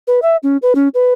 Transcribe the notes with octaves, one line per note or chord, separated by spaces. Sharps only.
B4
E5
C#4
B4
C#4
B4